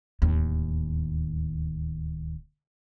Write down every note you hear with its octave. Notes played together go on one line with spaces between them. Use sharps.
D1 D#2